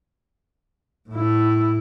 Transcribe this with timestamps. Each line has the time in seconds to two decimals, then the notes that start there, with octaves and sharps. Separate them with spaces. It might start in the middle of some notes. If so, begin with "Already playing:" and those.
1.10 A2 E4